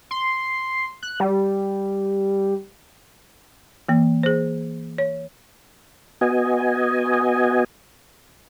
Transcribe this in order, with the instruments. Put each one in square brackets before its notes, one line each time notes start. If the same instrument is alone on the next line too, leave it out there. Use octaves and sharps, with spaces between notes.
[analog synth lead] C6
F#6
G3
[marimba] E3 A#3
G#4 C5
C#5
[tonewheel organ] B3 F#4 D#5 G#5